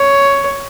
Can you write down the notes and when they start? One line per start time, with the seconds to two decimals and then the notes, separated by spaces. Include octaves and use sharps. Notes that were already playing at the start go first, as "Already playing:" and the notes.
Already playing: C#5